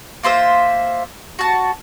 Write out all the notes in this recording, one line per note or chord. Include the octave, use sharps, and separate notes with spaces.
A#3 F4 C5 E5
F#4 A5